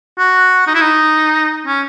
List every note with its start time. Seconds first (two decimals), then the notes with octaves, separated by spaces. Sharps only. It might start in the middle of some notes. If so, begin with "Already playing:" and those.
0.18 F#4
0.67 D#4
0.75 E4
0.81 D#4
1.66 C#4